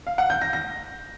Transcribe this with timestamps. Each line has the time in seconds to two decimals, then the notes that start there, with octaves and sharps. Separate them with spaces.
0.07 F5
0.18 F#5
0.30 G6
0.41 A#6
0.53 A#6